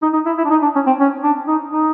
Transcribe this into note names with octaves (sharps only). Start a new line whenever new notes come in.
D#4
D#4
E4
E4
D4
D#4
D4
C#4
C4
C#4
D4
D#4
D#4